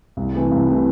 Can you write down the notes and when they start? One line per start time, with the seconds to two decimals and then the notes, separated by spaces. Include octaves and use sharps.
0.17 C2
0.34 C3 E3 A3
0.51 C2
0.68 C3 E3 A3